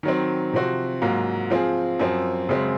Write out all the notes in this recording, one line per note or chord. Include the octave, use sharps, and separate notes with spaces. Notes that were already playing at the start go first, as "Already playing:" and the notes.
D#3 F#3 C4
C3 F3 C4 F#4
G#2 F#3 A#3 F4
F3 C4 F4 G#4
F#2 F3 C4
F#2 C#3 G#3 C4